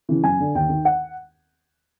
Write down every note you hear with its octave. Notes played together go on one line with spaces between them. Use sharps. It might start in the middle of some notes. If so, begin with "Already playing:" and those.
C#3 E3
F#2 G#5
D3
D#2 G5
D#3
F#5